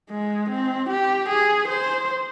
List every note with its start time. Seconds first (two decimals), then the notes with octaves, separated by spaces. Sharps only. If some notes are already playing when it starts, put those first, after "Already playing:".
0.10 G#3
0.49 C4
0.89 G4
1.29 G#4
1.68 C5